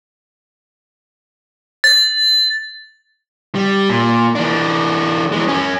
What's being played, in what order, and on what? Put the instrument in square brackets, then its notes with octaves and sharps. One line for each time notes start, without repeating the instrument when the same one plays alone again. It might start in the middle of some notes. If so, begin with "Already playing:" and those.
[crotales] A6
[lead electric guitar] G3
A#2
E3 D4
E3 G#3
F#2 C#4